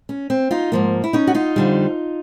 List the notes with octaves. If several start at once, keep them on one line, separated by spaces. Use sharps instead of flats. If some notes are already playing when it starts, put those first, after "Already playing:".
C#4
C4
D#4 F4
G#2 F3 A#3
E4
C#4 D#4
F#4
D#4 F4
F2 D3 G3